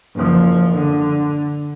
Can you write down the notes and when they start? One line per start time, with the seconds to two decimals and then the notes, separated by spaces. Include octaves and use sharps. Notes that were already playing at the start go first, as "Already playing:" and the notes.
0.15 F#1 F3
0.73 D3